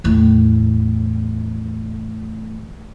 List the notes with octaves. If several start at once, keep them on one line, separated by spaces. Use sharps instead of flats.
E2 A2